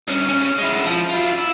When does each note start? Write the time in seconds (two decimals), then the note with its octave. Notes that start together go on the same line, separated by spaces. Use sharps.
0.08 G2 C#4
0.29 C#3 C#4
0.58 G#3 E4
0.86 F3
1.09 E4 F4
1.38 E4